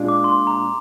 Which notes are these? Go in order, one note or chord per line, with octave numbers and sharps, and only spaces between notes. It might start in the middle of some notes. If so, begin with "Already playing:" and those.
Already playing: A#2 G#3 D4 F4
D6
C6
A#5